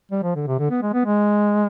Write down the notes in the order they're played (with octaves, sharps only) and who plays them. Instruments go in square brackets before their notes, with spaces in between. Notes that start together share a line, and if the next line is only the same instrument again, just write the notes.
[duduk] G3
F3
D3
C3
D3
B3
G#3
B3
G#3